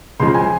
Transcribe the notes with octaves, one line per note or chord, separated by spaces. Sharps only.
C#2 C#3 F3 G#3 C6
G#5